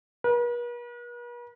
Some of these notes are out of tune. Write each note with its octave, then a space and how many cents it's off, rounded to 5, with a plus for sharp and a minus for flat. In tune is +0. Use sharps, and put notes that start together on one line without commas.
B4 -45